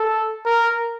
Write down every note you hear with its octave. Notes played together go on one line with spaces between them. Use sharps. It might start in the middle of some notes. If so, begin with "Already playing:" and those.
Already playing: A4
A#4